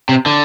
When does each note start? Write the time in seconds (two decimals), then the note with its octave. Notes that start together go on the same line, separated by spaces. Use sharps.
0.09 C3
0.26 D3